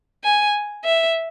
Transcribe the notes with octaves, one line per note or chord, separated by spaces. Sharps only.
G#5
E5